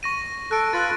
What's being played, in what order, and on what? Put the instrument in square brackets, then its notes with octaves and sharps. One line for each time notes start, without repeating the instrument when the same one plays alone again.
[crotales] C#6 A#6 D#7
[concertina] A4 [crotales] F#6 D7
[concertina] F4 B4 B5 [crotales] F#6 A6